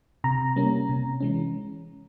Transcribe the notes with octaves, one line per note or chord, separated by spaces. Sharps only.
C3 A#5
G3 A#3 C#4
C3
E3 G#3 C#4